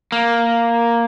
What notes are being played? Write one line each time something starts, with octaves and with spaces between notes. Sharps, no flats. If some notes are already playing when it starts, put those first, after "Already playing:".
A#3